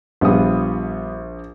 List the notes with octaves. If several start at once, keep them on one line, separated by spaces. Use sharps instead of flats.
A#1 G3 B3 F4 D#6